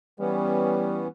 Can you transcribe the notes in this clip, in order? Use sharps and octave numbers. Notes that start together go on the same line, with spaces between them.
E3 G3 B3 C#4